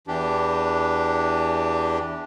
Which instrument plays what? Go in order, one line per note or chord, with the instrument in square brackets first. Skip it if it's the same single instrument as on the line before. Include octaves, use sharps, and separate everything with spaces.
[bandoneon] E2 E3 D4 G4